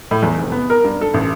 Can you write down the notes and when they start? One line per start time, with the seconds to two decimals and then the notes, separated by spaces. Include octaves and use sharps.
0.11 A2
0.22 E2
0.38 F1
0.52 B3
0.70 A#4
0.84 G2
1.01 A4
1.14 A1